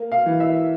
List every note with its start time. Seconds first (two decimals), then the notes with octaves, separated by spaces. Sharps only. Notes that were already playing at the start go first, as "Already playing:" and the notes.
Already playing: A#3
0.12 F5
0.26 E3
0.40 E5